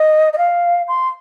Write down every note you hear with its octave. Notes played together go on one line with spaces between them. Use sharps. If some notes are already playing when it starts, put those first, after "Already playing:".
Already playing: D#5
D#5
F5
C6